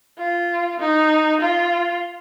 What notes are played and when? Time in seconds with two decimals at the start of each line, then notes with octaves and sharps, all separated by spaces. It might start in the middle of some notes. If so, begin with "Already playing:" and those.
0.19 F4
0.80 D#4
1.41 F4